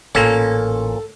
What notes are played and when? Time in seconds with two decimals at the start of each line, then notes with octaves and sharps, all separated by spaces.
0.15 A1 A#2 A#3 C#4 A4